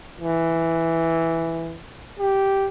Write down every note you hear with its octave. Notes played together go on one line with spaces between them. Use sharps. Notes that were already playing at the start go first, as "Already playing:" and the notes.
E3
G4